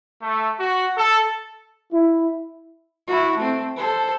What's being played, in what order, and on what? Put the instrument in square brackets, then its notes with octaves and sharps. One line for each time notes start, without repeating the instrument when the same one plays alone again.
[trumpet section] A3
F#4
A4
[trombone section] E4
[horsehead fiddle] E4 F#4
A3 C4
A4 C5